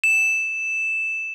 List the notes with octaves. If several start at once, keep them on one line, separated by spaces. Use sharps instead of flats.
E7